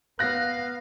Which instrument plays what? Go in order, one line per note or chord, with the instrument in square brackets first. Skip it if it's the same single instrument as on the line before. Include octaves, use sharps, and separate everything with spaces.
[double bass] B3 [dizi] F5 [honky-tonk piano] F#6 A#6